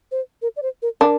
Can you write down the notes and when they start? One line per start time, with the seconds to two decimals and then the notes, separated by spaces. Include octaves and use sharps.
0.12 C5
0.42 A#4
0.56 D5
0.62 C5
0.82 A#4
1.01 D4 A#4